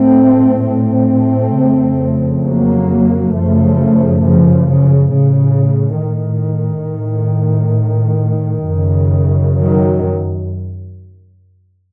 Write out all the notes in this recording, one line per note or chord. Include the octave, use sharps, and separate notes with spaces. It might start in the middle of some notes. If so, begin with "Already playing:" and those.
Already playing: A2 A3 C4
A3 C4
F2 C#3
F#3 A#3
F#2 C#3 F3 A3
C#3 F3
C#3
A2 C#3
D#3
A2
F#2 C#3
D#3 F#3